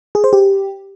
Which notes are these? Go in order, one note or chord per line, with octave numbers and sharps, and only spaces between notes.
G#4
C5
G4